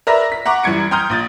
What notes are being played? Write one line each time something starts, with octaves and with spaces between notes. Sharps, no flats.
A#4 B4 D5 E5 A#5 A#6
B6
F#5 A#5 C#6 D6
F#2 E3 G3 G#6 C#7 D7
G5 A#5 C6 D#6 F6 G6
A#1 D#6 A6